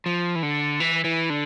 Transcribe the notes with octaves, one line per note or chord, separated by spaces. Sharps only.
F3
E3
D3
E3
E3
D3